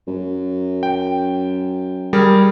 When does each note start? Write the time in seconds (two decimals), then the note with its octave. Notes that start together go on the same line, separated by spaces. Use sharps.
0.08 F#2
0.83 G5
2.13 G3 G#4 A#4